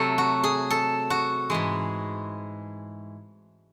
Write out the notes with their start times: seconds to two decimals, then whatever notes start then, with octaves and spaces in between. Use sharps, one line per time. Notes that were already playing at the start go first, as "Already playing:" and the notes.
Already playing: C3 F#3 A3 A4
0.18 F#4
0.44 G#4
0.70 A4
1.10 F#4
1.50 G#2 E3 G#3